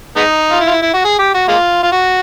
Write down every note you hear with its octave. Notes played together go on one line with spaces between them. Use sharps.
G#3 B3 D#4
F4
E4
F4
E4
E4
F#4
G#4
G4
F#4
G#3 A#3 F4
F4
F#4